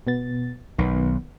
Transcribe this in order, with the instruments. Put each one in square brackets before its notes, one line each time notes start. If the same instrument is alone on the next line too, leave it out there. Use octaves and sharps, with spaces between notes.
[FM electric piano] B2 B3 A6
[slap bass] B1 [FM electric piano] D#3 B3